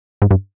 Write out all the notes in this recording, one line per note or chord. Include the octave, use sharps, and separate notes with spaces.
G#2
G2